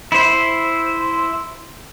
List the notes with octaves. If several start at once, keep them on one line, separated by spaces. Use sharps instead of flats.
E4 C5